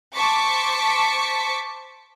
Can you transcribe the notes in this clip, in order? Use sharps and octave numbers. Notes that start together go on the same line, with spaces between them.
C5 A5 C#6 D6 B6 C#7